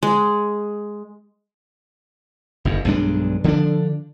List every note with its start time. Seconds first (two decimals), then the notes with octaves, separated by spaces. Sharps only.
0.03 G#3
2.65 F#1 F#2
2.85 B1 G2 G#3 D4
3.44 D3 F3 A#3 D4